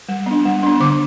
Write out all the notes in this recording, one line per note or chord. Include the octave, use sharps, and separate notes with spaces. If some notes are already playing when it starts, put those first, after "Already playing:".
G3
B3 D4
G3
B3 D4
D3 D6